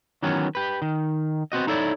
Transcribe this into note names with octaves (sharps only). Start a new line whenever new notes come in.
D#3 E3 F#3 B3 C#4
G4 B4
D#3
B3 C4 F#4 D#5
D#4 E4 A4 C#5 D5